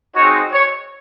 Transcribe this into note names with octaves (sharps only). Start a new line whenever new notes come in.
G#3 C4 D#4 F#4 C#5
C#5